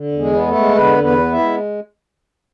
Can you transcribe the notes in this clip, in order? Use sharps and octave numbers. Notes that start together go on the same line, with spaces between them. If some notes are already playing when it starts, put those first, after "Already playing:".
Already playing: D3
E2
G#3 G#4
B3
A3 A4
G#3
D3 B3 B4
E2
B3 B4
B3
E4 E5
G#3